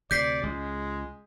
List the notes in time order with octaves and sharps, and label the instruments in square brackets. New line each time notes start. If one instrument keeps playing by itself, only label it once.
[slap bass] D2 C3 [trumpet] D5 [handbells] G6 B6 C7
[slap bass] C#2 [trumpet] G#3